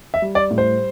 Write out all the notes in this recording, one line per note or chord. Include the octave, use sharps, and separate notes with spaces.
E5
G3
D5
A2
C5